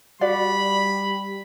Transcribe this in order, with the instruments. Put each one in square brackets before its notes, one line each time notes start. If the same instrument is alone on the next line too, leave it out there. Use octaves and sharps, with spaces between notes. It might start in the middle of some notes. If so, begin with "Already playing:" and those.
[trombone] G3 [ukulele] F#4 D5 F5 [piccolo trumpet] B5